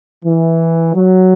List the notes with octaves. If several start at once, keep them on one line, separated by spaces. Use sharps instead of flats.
E3
F#3